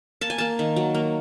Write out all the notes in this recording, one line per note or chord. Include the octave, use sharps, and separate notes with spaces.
A#3 A5
G#5
A#3 A5
D#3
F#3
A#3